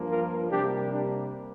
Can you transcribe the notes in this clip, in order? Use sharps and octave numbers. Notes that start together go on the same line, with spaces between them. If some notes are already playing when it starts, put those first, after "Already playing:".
Already playing: G2 F3 A#3
F4 A#4
C3 G3 A#3 D4 G4
D4